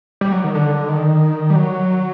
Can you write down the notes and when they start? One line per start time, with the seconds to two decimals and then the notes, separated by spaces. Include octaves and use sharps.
0.21 G3
0.32 F#3
0.44 D#3
0.55 D3
0.89 D#3
1.50 G3
1.56 F#3